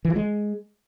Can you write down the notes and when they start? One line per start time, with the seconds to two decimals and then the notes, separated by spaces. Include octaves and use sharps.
0.05 E3
0.10 F3
0.16 G#3